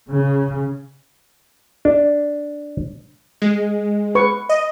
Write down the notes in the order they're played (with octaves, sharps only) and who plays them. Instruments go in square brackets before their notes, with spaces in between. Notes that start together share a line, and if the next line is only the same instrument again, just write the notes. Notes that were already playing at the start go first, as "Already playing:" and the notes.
[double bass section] C#3
[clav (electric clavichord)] D4
[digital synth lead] G#3
[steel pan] B4 C#6
[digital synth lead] D#5